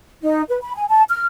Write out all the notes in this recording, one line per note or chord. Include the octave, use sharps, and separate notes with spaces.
D#4
B4
B5
G#5
A5
F6